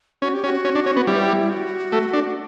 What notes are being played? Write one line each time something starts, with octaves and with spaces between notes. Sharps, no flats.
C#4 F#4
G4
C#4 F#4
C#4
D4
C#4
B3
G3 E4
F#4
A3
D4